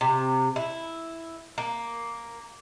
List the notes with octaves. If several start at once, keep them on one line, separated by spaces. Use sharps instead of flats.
C3
E4
A#3